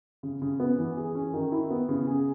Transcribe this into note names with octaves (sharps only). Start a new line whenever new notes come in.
C#3
C#3
B3
E3
G#4
C#4
D#3
E4
B3
C#3
G#4